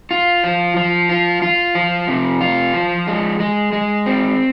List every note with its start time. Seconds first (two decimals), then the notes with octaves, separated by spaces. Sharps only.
0.11 F4
0.44 F3
0.76 F3
1.09 F4
1.42 F4
1.75 F3
2.08 C3
2.41 F4
2.74 F3
3.07 G#3
3.40 G#3
3.73 G#3
4.06 C4